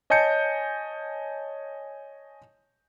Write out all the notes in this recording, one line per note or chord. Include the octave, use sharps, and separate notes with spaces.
C#5 D#5 G#5 A5 G6 C#7